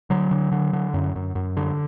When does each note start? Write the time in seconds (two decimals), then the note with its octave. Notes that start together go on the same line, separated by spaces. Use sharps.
0.10 D3 F#3
0.31 D3
0.52 D3
0.73 D3
0.94 F#2
1.16 F#2
1.35 F#2
1.57 D3